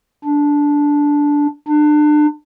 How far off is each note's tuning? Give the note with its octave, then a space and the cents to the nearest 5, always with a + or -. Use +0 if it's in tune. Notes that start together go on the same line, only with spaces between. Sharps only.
D4 -10
D4 +30